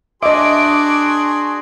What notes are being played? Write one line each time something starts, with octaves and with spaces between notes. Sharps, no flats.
D4 F#4 G#4 D#5 E5 C6 D6